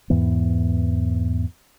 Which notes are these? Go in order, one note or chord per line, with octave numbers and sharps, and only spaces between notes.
E2 G#2 E3 B3